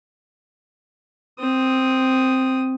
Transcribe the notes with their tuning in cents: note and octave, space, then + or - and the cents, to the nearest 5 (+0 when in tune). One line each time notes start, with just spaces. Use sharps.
C4 +0 D#6 +0